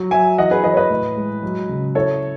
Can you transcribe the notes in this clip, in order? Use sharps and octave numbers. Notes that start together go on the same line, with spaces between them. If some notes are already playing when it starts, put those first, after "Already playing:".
Already playing: F#3
F#3 E5 G#5
E3 D#5 F#5
G#4 B4
E3 B4 D#5
C#5
B4 D#5
A2
G#3
F#3
C#3
E4 A4 C#5